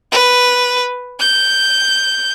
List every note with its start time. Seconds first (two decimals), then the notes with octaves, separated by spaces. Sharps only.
0.12 B4
1.20 G6